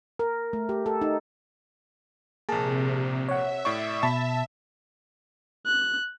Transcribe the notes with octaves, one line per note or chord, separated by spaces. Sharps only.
A#4
A3
G4
A4
D#4
A#1 C3 A#3 G#4 A5
C#5 E5 F#5
A2 D5 C#6
B2 A5 B5
F#6